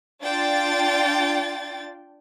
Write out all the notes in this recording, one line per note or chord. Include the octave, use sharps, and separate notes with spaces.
D4 F4 G5 A6